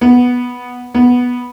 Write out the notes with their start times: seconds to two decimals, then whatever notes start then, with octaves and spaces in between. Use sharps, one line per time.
0.01 B3
0.94 B3